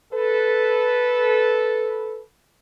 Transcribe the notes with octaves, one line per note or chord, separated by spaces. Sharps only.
A4 B4